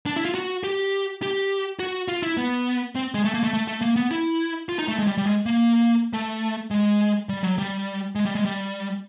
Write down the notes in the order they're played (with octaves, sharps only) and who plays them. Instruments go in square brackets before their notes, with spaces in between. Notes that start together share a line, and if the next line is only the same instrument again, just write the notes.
[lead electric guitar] D4
E4
F4
F#4
G4
G4
F#4
F4
E4
B3
C4
G#3
A3
A#3
A3
A3
A3
A#3
B3
E4
F4
D#4
A3
G#3
G3
G3
G#3
A#3
A3
G#3
G3
F#3
G3
G#3
G3
G#3
G3